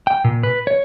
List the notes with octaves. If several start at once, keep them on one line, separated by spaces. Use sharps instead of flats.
G5
A#2
B4
C#5